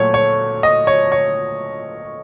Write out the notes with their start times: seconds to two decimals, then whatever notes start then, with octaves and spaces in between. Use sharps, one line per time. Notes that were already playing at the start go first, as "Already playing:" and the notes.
Already playing: A#2 F#3 A3 C#5
0.14 C#5
0.63 D#5
0.87 C#5
1.12 C#5